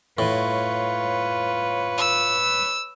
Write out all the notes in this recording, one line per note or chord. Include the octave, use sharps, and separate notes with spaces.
A2 F4 B4 C#5
E6